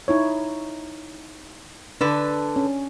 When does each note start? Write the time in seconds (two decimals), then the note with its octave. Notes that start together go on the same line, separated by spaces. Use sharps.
0.08 D#4 E4 C#5
2.01 D3 D4 A4 B4
2.56 C#4